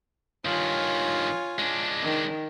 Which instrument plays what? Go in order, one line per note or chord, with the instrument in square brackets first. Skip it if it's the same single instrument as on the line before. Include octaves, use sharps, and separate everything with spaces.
[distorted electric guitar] G2 D#3 [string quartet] F4 C#5 G#5
[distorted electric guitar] G#3 D4
[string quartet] D#3